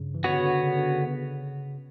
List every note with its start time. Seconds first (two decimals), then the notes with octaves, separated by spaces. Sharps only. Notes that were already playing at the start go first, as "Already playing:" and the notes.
Already playing: G2 C#3
0.15 E3
0.24 D3 B3 F#4 C#5
0.33 C#3
0.44 D3
0.63 C#3
0.77 D3
0.91 C#3